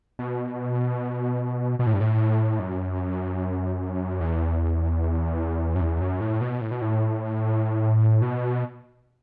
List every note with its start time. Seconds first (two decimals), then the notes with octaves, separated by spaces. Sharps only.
0.19 B2
1.79 B2
1.87 A2
1.94 G2
2.01 A2
2.59 F#2
4.20 E2
5.75 F#2
5.81 E2
6.01 F#2
6.21 A2
6.41 B2
6.61 A2
6.71 B2
6.82 A2
8.22 B2